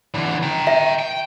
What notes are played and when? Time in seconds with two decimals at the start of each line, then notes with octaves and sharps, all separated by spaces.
0.15 D3 E3
0.43 G5 A#5
0.67 E5
0.99 G5